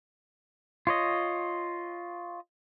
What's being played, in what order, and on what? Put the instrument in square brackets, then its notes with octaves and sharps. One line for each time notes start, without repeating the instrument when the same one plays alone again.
[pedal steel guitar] F4 C#5 D#5